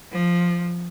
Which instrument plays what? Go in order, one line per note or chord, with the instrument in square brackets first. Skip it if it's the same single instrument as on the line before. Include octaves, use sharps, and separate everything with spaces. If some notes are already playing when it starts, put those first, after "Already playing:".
[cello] F3